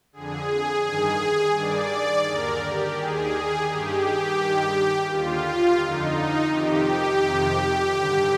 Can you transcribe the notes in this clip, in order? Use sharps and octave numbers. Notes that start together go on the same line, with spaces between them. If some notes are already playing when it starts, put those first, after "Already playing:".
F2 D3 G#4
G2 D#3 G#4
G2 D#3 D5
D#2 D3 A#4
G4
D#2 D#3 G#4
G2 D#3 G4
G2 D#3
D#2 D3 F4
F2 D3 D#4
F2 C3 D#3 G4
F2 C3 D#3
G2 D3